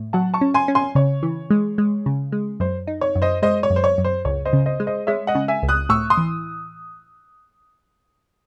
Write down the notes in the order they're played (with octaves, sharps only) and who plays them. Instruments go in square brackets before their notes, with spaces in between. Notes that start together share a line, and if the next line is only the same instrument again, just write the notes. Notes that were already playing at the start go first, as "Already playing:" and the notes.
Already playing: [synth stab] A2
[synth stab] F#3 [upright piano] F#5 A5
[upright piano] A5 C#6
[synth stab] C#4
[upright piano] G#5 C6
[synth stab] C#4
[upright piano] G#5 C6
[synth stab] C#3 [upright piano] C#5
[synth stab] E3
G#3
G#3
C#3
G#3
[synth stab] F#2 [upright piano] C5
[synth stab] D#4
[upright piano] C#5
[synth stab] F#2
[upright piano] C5 D#5
[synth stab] G#3 [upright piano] C5 D#5
[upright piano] C#5
[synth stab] F#2
[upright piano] C5
C#5
[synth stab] F#2
[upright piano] C5
[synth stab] C#2 [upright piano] C#5
[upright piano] C5 D#5
[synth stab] C#3
[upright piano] C5 D#5
[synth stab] G#3
[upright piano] C5 D#5
[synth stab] G#3 [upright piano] C#5 E5
[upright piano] D#5 F#5
[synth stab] C#3
[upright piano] E5 G#5
[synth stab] C#2
[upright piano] D#6 F#6
[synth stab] A2 [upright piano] C#6 E6
[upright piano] C6 D#6
[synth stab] E3